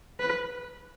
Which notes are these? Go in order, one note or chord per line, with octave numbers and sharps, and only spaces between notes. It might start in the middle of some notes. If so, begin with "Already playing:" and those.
B4